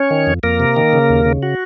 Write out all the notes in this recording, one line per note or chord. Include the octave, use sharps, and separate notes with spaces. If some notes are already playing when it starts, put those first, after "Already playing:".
Already playing: C#4 C#5
D#3
F2
F2 A#3 A#4
C3
D#3
C#3
D#2
C#3
F#4